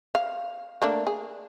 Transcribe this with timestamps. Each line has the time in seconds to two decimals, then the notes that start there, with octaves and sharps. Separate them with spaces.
0.15 F5
0.82 A3 A#3 D4
1.07 G#4